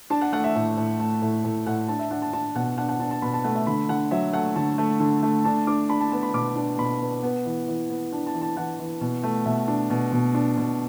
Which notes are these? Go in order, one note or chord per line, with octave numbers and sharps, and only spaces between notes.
D4 A5
F#5
A3 F#5
E5
A2
A2
A3
A2
A2
A2 F#5
D4 A5
E5
D4 F#5
A5
D4 A5
B2 F#5
D4 F#5
F#5
D4 A5
A5
B2 B5
A5
A3 F#5
E5
D3 B5
D3 F#5
F#3 E5
A3 F#5
D3 A5
A3
D3
A3
D4 A5
D4 D6
D4 B5
A5
B3 A5
B5
B2 D6
D4
B2 B5
B3
B3
E3
E3
B3
D4
A5
E3
A5
E3 F#5
E3
B2
A3
B2 E5
D4
B2
B2
D4
B2